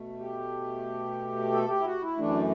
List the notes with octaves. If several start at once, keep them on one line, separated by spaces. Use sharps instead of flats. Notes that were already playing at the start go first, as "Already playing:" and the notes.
Already playing: B2 A3
G4
A4
G4
E4
F#4
E4
F#2 E3 A3 D4